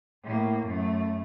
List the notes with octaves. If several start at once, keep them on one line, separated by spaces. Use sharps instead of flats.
A2 A#3
F#2 A3